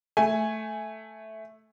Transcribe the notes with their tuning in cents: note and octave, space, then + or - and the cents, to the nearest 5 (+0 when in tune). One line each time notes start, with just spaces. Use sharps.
A3 +0 G#5 +0